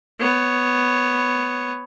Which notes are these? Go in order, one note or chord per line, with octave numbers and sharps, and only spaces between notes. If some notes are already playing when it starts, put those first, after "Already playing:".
B3 C#5